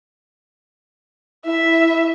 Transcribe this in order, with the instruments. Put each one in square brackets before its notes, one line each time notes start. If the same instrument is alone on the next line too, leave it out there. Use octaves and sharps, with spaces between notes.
[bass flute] E4 [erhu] E5